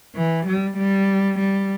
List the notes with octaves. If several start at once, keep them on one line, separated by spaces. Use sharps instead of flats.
E3
G3
G3
G3